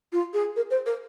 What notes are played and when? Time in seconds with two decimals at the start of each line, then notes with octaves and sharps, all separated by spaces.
0.12 F4
0.33 G#4
0.56 A#4
0.70 C5
0.86 A#4